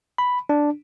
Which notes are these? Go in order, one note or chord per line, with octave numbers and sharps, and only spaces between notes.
B5
D4